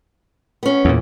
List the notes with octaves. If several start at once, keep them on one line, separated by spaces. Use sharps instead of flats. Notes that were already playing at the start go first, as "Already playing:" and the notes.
B3 C#4
E2 A#2